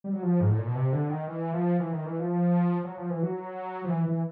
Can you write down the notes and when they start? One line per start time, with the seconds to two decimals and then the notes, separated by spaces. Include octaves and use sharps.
0.04 G3
0.13 F#3
0.23 F3
0.41 G#2
0.49 A2
0.58 A#2
0.67 B2
0.75 C3
0.92 D3
1.09 D#3
1.27 E3
1.53 F3
1.80 E3
1.93 D#3
2.06 E3
2.19 F3
2.84 F#3
2.97 F3
3.10 E3
3.23 F#3
3.84 F3
3.89 E3
4.06 E3